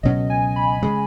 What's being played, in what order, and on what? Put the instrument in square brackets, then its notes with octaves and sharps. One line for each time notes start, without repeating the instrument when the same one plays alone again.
[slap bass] C#2 B2 F#3 C#4 [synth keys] D#5
[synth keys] G#5
B5
[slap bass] C#3 G#3